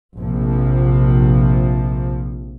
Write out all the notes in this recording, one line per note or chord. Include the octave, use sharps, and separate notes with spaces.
A#1 C3 F3